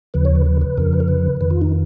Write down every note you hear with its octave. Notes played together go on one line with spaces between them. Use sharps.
D#2 C#3 F3 B4
C#5
B4
B4
B4
F2 C#3 F3 A#4
B4
A#4
B4
F2 D#3 B4
F4
D#4